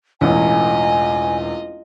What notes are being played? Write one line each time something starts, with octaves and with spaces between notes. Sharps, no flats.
E1 A1 E2 F4 D#5 G#5